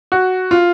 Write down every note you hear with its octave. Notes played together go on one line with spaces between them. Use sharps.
F#4
F4